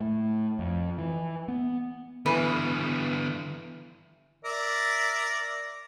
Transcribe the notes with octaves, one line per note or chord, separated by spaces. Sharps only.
A2
F2
E3
B3
D3 E3 B3
A#4 D5 E5